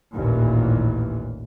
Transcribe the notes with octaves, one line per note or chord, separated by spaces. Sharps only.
A1 D#2 A#2 E3